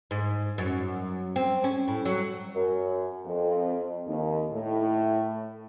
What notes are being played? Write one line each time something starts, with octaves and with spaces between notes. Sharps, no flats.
G#2
F#2
C4
C#4
A2
F#3
F#2
F2
D#2
A2